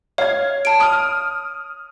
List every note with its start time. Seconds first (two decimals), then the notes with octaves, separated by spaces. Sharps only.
0.18 C#5 F5 G#6
0.65 A5 D7
0.80 D#6 F6